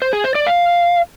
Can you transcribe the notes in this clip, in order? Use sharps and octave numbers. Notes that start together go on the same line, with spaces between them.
C5
G#4
C5
D5
F5